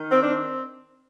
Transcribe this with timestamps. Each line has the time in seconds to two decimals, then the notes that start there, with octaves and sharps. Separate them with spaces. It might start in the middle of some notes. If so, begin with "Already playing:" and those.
Already playing: D#3
0.10 C4
0.21 C4 D4